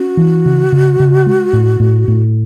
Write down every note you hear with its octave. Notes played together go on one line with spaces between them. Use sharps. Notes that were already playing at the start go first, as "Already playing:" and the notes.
Already playing: C#4 F#4
E3
C#3
C#3
C#3
G#3
A2
A2
A2